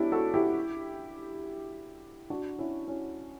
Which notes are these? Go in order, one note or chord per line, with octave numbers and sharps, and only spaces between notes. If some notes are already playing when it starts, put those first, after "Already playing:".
Already playing: F#3 B3 C#4 D4 E4 G4
F#4 A4
E4 G4
D4 F#4
C#4 E4
C#4 E4